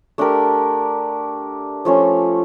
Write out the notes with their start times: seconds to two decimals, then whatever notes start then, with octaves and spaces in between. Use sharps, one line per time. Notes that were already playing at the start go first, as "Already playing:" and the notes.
0.18 A3 D4 G4 A#4
1.85 F3 A3 C#4